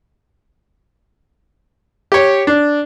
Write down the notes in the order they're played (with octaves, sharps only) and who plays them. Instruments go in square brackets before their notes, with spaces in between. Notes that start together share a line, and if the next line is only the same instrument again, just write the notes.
[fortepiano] G4 C#5
D4